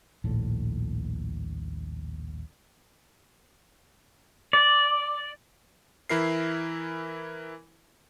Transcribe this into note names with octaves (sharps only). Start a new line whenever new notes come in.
D#1 A#1 A2
D5
E3 E4 A#4 C7